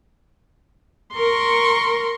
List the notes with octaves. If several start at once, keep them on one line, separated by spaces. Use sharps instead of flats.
A#4 C6 C#6